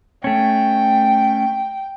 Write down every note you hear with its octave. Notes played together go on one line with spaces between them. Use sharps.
A3 C#4 G5